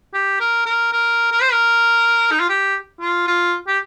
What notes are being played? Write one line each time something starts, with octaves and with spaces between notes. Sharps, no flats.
G4
A#4
A#4
A#4
A#4
C5
A#4
D#4
F4
G4
F4
F4
G4